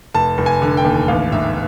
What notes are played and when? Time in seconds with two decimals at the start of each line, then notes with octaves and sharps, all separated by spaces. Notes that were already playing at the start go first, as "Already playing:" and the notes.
0.14 F1 A5
0.38 F1
0.46 G#5
0.62 D3
0.77 G5
0.85 D#2
1.08 A1 F5
1.32 G#2 E5